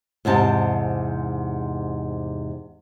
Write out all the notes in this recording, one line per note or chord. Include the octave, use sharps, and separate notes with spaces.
E2 G#2 C3 A5